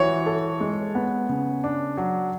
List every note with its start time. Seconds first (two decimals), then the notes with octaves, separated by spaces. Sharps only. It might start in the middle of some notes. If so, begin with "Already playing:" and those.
Already playing: E3 F#4 C#5
0.26 A4
0.61 G#3
0.95 B3
1.29 C#3
1.64 D4
1.97 F#3